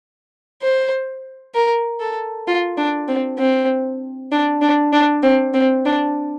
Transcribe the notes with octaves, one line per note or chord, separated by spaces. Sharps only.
C5
A#4
A4
F4
D4
C4
C4
D4
D4
D4
C4
C4
D4